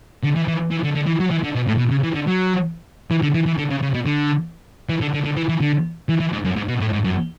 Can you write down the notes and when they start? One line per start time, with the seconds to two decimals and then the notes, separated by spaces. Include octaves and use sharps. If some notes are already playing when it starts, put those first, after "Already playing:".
0.24 D3
0.36 E3
0.48 E3
0.71 E3
0.84 D3
0.95 D3
1.06 E3
1.20 F#3
1.31 E3
1.44 D3
1.55 B2
1.67 A2
1.78 B2
1.91 C#3
2.03 E3
2.14 D3
2.27 F#3
3.11 E3
3.22 D3
3.34 E3
3.46 E3
3.58 D3
3.70 C#3
3.82 C#3
3.94 B2
4.06 D3
4.89 E3
5.01 D3
5.14 D3
5.25 D3
5.36 E3
5.49 E3
5.61 D3
6.09 E3
6.20 E3
6.32 G#2
6.44 F#2
6.56 G#2
6.68 B2
6.80 A2
6.93 G#2
7.04 F#2